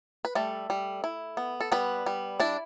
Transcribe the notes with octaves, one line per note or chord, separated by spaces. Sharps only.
B4
G3 A3 A4
G3
E4
B3
A4
G3 B3 B4
G3
D4 E4 D5